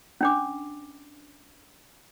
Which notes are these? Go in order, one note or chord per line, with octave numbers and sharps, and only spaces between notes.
C#4 D4 D6